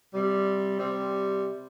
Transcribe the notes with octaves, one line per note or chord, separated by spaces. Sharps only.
C3 G3
C3 G3 C4